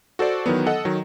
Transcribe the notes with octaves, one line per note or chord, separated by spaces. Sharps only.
F#4 A4 C5 D5
D#3 E3 F#3 B3
A4 D#5 F#5
D#3 F#3